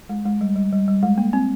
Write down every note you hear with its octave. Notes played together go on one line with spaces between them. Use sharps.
G#3
G#3
G3
G3
G3
G3
G#3
A#3
C4